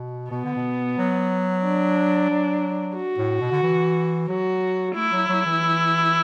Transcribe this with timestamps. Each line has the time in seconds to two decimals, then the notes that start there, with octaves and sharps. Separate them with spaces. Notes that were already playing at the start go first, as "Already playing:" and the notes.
Already playing: B2
0.31 B2 B3
0.44 D3
0.56 B2
0.98 F#3
1.64 D4
2.30 F#3
2.96 F#4
3.18 A2
3.41 B2
3.52 D3
3.63 E3
4.29 F#3 F#4
4.95 A3 E4
5.12 F#3
5.29 F#3
5.46 E3